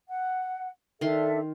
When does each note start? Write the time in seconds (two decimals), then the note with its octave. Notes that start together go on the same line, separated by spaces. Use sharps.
0.08 F#5
1.01 D#3 D4 A4 E5 C6